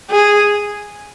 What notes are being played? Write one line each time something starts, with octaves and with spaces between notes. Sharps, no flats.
G#4